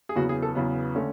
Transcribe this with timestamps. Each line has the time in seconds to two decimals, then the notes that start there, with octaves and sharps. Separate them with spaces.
0.09 G#4
0.15 E2 C#3 F#3 B3 F#4
0.29 G#4
0.42 A4
0.55 E2 C#3 F#3 B3
0.95 D3 A3 C#4